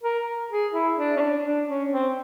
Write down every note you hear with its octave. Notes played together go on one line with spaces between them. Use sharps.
A#4
G#4
E4
D4
C#4
D4
D4
C#4
C4